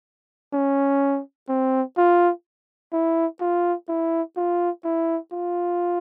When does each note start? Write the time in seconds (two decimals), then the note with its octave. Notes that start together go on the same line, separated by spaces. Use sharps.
0.53 C#4
1.49 C4
1.97 F4
2.93 E4
3.41 F4
3.88 E4
4.37 F4
4.84 E4
5.32 F4